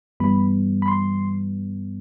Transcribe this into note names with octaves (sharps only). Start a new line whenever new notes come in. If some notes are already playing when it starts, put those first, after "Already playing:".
G2 E3 G3 B3 B5
B5
C6